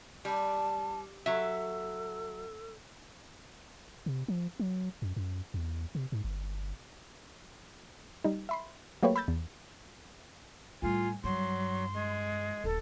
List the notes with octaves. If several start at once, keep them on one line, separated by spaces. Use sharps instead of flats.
G3 A5
F#3 A4 E5
C3
F3
F#3
F#2
F#2
E2
C3
G#2
G1
G3 D#4
E5 B5 C6
F#3 A3 A#3 G4 B4 C#5
B5 E6 G6 A6
E2
A2 G3 F4 G#5
G2 F#3 C6
G#3
D#1 A4